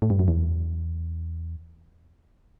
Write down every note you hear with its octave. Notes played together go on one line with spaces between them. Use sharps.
A2
G2
F#2
E2